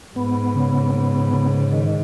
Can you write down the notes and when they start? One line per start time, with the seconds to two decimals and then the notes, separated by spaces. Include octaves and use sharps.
0.16 G#2 B3
0.55 C#3
0.95 B3
1.33 C#3
1.73 D#3